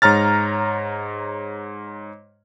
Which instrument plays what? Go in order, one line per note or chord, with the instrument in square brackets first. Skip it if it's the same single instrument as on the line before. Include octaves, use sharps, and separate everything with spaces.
[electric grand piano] G#2 C#5 A#5 F6 A6